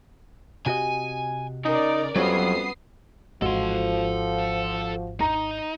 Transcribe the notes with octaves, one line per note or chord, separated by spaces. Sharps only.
C3 F#4 D#5 G#5
C#3 D#4 A#4 D5
F2 F#3 G3 B3 C#4 F#4 D#6 C7
G#1 F3 G#3 F#4 A4 C6
D#4 A#5